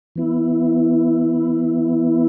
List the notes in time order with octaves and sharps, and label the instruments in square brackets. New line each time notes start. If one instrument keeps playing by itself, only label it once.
[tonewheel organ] E3 B3 E4